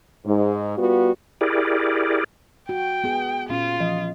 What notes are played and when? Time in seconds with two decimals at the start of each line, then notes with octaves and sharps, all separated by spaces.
0.24 G#2
0.76 G3 B3 F4 F#4
1.41 E4 G4 G#4 A#4 D5
2.69 F#4 G5
3.04 B3 G#4
3.49 A#2 C#4 F4
3.80 E3 F3 D#5